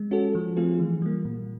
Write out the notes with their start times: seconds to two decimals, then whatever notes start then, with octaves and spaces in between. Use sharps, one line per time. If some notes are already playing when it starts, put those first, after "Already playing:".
Already playing: G#3
0.11 C#4 F#4 A4
0.35 F3
0.57 A3 C4 F4 G#4
0.79 E3
1.02 G3 A#3
1.25 A#2